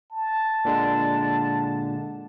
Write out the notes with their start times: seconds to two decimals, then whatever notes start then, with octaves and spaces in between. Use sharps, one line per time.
0.12 A5
0.65 A#2 D3 G#3